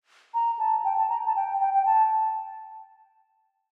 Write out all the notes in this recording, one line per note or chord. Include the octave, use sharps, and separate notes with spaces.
A#5
A5
G5
A5
A#5
A5
G5
G5
G5
A5